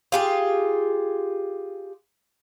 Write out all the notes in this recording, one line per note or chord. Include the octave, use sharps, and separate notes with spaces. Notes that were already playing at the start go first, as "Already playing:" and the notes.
F4 G4 G#4